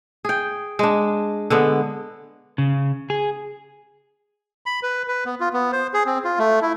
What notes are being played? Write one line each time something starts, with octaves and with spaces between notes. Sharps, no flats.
G#4 G5
G#3 D4
D3 G#3 B3
C#3
G#4
B5
B4
B4
B3
F4
B3
C5
G#4
C4
F4
A3
E4